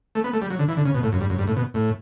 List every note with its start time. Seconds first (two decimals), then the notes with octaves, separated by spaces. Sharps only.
0.15 A3
0.24 B3
0.33 A3
0.42 G3
0.50 F#3
0.59 D3
0.68 E3
0.77 D3
0.85 C#3
0.95 B2
1.03 A2
1.12 F#2
1.21 G2
1.30 F#2
1.38 G2
1.47 A2
1.56 B2
1.74 A2